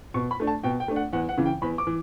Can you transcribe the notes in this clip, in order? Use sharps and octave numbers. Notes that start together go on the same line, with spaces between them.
B2 C#6
B5
A3 D4
A5
B2 G5
G5
A3 D4
F#5
E2 F#5
F#5
C#3 E3
G5
E2 B5
D6
E3